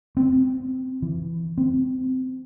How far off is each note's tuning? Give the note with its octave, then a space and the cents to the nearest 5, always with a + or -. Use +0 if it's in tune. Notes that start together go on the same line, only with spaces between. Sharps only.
C4 -15
E3 +15
C4 -20